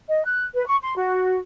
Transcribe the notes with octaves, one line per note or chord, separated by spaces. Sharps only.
D#5
F#6
B4
C#6
C6
F#4